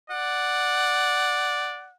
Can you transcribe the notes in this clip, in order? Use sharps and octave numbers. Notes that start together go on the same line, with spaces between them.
D5 F#5